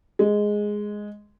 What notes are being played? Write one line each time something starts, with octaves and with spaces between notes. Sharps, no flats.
G#3